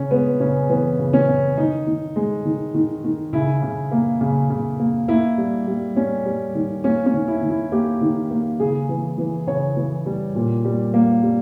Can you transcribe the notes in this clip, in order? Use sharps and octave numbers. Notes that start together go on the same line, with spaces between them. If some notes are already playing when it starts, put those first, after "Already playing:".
Already playing: C#3 C#4
G#3 B3
C#3 C#4
E3 B3
C#3
C#4
C#3
D#3 D#4
D#3
G#3
D#3
D#3
D#3
C#3 E4
C#3
A#3
C#3
C#3
A#3
A#3 E4
G3
G3
G3 C#4
G3
D#3
A#3 C#4
C#4
D#3
E4
D#3
E4
A#3 G4
D#3
A#3
C#3 G#4
E3
E3
C#3 C#5
E3
G3
A#2
G3
A#3
G3